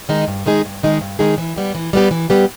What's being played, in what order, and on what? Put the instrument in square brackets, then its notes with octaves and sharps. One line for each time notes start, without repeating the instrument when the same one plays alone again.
[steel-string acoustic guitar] D#3 G#3 D#4 G#4
G2
D#3 G#3 D#4 G#4
G2
D#3 G#3 D#4 G#4
G2
D#3 G#3 D#4 G#4
E3
G3 B3 G4
E3
G3 B3 G4
E3
G3 B3 G4